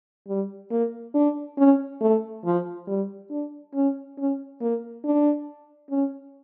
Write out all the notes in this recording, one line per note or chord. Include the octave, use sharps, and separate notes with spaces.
G3
A#3
D4
C#4
A3
F3
G3
D4
C#4
C#4
A#3
D4
C#4